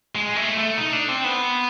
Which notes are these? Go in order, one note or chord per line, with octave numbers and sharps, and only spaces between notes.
G#3
A3
A3
D#4
D4
C4
B3